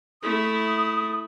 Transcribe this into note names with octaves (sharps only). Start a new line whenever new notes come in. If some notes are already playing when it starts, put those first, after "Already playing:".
A3 E4 D#6